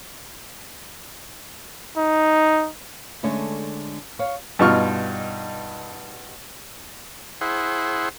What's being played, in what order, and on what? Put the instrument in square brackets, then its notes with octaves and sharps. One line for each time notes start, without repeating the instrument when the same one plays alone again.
[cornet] D#4
[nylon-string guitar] D3 G#3 A3 C#4
C#5 F5
[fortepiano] G2 B2 D#4 F4 C#6 F6
[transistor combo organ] E4 G#4 C5 F#5